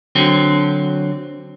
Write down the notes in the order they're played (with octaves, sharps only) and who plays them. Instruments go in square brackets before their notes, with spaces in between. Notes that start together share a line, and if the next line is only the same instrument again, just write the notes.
[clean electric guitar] D3 F#3 C4